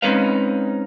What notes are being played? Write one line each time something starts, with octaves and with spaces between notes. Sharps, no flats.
G#3 C4 C#4 D#4 B4 F5